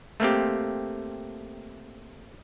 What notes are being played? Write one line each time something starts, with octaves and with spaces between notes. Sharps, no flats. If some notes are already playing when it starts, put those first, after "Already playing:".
A3 A#3 C4 G4